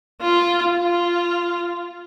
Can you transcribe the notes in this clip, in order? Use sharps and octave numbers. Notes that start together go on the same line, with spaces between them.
F4
F4